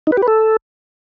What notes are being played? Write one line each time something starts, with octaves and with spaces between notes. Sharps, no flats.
D#4
B4
G4
B4
A4